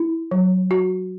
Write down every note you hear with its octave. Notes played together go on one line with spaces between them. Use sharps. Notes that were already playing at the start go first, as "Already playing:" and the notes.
Already playing: E4
F#3
F#4